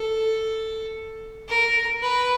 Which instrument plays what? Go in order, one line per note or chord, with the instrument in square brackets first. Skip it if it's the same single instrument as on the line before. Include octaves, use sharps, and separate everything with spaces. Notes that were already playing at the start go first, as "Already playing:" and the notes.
Already playing: [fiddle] A4
A#4
B4